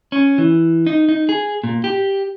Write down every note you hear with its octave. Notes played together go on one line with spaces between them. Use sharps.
C#4
E3
D#4
D#4
G#4
A#2
G4